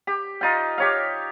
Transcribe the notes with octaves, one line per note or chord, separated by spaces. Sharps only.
G4
D#4 F4 G5
G4 C#5 F5